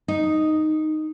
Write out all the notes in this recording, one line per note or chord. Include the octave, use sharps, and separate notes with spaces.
D#4